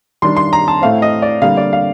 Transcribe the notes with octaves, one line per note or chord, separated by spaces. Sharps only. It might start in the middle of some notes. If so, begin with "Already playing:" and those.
D#3 G3 D4 C6
C6
A#5
A5
A2 A3 C4 F5
D#5
D5
D3 G3 A#3 F5
D5
F5